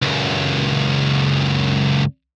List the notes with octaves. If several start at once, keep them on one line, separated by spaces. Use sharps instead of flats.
C#2 F#2